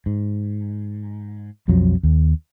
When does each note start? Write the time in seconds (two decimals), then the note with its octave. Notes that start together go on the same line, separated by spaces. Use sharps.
0.06 G#2
1.68 B1 F2 F3 F#3
2.03 D#2